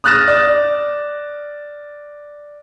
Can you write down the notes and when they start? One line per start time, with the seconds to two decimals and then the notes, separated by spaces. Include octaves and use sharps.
0.04 D#6 F6 F#6 A6 A#6 E7
0.28 D5